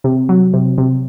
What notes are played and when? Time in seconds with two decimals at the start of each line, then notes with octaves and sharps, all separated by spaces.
0.04 C3
0.29 F#3
0.53 C3
0.78 C3